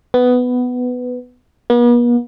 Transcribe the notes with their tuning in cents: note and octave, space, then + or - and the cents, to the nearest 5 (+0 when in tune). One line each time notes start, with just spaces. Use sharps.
B3 +10
B3 -45